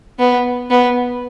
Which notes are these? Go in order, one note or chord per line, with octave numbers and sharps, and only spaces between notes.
B3
B3